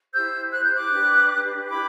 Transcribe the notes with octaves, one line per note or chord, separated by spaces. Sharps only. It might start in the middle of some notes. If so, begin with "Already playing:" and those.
E4 G4 C5 E6 G6
F#6
G6
D6 F#6
D4 G4 B4
E4 G4 B4 B5 D6